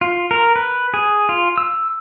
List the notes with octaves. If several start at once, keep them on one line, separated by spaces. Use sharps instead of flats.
F4
A#4
B4
G#4
F4
E6